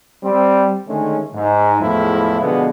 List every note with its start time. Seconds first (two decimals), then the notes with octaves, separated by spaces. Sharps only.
0.23 G3 C4
0.87 D3 D#3 G#3 A3 C#4
1.34 G#2
1.80 E2 A2 F3 G#3 E4
2.40 B2 D3 F3 G#3 B3